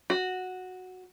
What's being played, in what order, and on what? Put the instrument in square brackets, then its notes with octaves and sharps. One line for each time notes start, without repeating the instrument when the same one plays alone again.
[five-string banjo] F#4